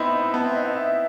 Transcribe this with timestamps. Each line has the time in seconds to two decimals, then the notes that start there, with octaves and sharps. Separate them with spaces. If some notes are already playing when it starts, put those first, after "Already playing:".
Already playing: B3 C4 D#4 E4 B5
0.13 D#4
0.34 B3 A5
0.44 C4 E5
0.55 D#4 D#5
0.65 E4 F#5
0.69 E5